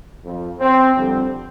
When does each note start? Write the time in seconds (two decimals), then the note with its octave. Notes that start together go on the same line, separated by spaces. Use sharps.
0.24 F2 F3
0.60 C4
0.95 F2 D3 G3 C4